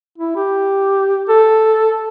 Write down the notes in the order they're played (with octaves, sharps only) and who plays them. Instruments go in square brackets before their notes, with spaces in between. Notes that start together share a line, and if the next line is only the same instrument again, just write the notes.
[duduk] E4
G4
A4